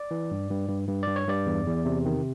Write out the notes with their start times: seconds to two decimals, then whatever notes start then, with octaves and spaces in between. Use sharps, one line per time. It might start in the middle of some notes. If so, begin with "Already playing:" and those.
Already playing: D5
0.11 E3
0.31 G2
0.50 G2
0.69 G2
0.88 G2
1.03 G2 D5
1.16 C#5
1.27 G2 D5
1.46 E2
1.67 E2
1.85 C3
2.05 D#3